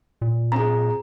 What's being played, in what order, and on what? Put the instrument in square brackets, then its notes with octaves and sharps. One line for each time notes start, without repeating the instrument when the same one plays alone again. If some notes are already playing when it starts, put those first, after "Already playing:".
[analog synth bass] A#2
[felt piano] C4 G#4 [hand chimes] A#5